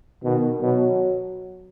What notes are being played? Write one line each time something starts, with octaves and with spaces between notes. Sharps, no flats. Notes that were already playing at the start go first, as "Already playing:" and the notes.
B2 D#3
B2 F#3